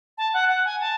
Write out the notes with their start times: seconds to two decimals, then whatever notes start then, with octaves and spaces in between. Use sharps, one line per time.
0.18 A5
0.34 F#5
0.48 F#5
0.65 G#5
0.80 A5